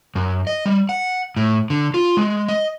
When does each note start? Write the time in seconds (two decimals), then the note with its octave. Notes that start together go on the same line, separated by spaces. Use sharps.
0.16 F#2
0.47 D#5
0.66 G3
0.89 F#5
1.37 A2
1.70 D3
1.94 F4
2.17 G#3
2.48 D#5